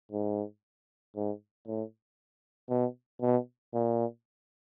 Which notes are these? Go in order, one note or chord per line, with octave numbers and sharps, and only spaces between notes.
G#2
G#2
A2
B2
B2
A#2